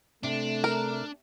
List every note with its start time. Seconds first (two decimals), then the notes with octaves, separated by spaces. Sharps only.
0.23 C3 A3 D4
0.64 A#4